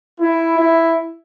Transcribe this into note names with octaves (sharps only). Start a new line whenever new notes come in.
E4
E4